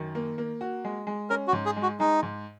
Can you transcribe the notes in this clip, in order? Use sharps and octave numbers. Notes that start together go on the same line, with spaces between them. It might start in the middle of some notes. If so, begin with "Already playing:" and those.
Already playing: F#2 D#3
A#3
A#3
F#4
G#3
G#3
C#4 A#4
F#4
G#2
G#4
G#3
F#4
G#3 D#4
G#2